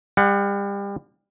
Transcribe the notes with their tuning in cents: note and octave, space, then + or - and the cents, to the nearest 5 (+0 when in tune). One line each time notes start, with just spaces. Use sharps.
G3 +35 F#5 +0